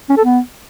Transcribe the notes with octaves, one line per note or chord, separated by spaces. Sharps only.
C#4
A4
B3